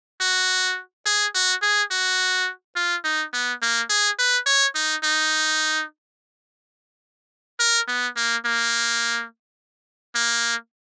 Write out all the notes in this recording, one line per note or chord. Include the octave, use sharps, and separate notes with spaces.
F#4
G#4
F#4
G#4
F#4
F4
D#4
B3
A#3
G#4
B4
C#5
D#4
D#4
A#4
B3
A#3
A#3
A#3